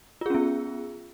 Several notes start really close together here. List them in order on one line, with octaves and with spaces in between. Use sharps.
F4 G#4 C#4 B3